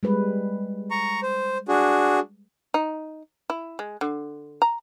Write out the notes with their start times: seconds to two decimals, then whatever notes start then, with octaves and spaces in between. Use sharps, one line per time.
0.03 G3 G#3 B4
0.91 A#5 C#6
1.22 C5
1.68 D4 F#4 G#4
2.74 D#4
3.50 E4
3.79 G#3
4.01 D3
4.62 A#5